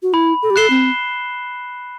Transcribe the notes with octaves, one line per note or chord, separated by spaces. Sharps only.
F#4
E4 B5
A4
G4
A4 F#6 C7 E7 G7
C4